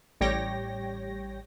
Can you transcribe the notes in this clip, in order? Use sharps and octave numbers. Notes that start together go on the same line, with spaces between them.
A1 G3 G4 C#5 G5 A#6